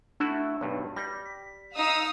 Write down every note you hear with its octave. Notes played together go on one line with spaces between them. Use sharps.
A3 D4 E4 F#4
B1 G2
G3 A#6
B6
D#4 F5 D#6 E6